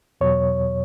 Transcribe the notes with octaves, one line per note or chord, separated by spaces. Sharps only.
E2 B2 F#3 C#5